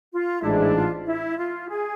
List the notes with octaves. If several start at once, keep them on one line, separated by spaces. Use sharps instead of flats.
F4
A1 G#2 G#3 D4 E4
E4
F4
E4
F4
G#4